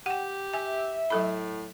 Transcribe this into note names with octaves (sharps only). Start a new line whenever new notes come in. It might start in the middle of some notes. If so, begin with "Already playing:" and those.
G4 F#5 G5
E5 G#5
A2 F#3 A4 B5